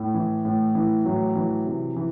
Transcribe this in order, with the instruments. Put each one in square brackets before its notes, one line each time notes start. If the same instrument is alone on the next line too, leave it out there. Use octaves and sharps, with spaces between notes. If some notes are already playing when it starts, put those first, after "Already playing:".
Already playing: [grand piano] A2
E3
A2
E3
A2 F#3
E3
C3
E3